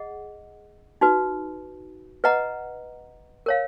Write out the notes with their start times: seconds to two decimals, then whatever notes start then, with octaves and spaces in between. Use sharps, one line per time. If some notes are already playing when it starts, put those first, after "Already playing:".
Already playing: G#4 D#5 F#5
1.01 D#4 F#4 B4
2.24 B4 D#5 F#5 A#5
3.46 A#4 C#5 F5